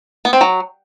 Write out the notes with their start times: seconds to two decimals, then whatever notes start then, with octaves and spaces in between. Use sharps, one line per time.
0.25 B3
0.33 C4
0.41 F#3